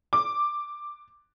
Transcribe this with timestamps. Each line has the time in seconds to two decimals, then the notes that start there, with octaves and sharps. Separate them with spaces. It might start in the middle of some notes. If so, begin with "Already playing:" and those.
0.13 D6